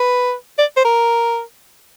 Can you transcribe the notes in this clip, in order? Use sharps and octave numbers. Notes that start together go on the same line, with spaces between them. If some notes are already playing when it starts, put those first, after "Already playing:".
Already playing: B4
D5
C5
A#4